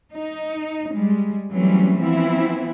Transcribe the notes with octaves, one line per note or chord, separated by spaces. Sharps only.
D#4
G3 G#3
E3 F#3 G3 A3 C4 C#4
E3 F3 B3 C4 E4